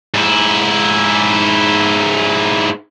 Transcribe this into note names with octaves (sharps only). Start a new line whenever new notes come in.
G#2 E4